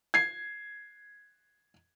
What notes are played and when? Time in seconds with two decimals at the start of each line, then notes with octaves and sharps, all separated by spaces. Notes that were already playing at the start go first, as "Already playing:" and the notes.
0.14 G#6 C7